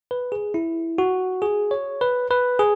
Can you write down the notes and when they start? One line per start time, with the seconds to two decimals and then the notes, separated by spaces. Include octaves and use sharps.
0.11 B4
0.32 G#4
0.54 E4
0.98 F#4
1.42 G#4
1.71 C#5
2.01 B4
2.31 B4
2.59 G#4